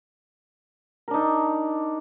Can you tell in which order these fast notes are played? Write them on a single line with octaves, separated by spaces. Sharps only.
A#4 D4 D#4